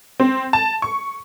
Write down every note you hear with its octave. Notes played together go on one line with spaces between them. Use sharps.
C4
A5
C#6